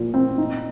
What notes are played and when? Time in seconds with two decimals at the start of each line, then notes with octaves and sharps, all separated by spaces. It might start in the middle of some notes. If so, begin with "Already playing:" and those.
Already playing: A#2 F3
0.14 C4
0.38 D#4